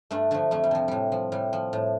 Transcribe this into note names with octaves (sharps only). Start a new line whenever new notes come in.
G2 A3 D4
D3 F3 A3
F2 A3
G3
C3 F3
A2 G3
F3
A2 G3
F3
A2